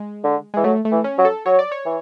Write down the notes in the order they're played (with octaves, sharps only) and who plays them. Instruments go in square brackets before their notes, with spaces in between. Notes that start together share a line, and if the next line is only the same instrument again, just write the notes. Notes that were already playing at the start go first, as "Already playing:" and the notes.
Already playing: [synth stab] G#3
[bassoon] D3
[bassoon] E3 [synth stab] G#3
[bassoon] F#3 [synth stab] A3
[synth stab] A3
[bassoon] E3
[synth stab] C#4
[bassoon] F#3
[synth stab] A4
[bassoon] F#3 [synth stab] C#5
[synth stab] D5
C#5
[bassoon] E3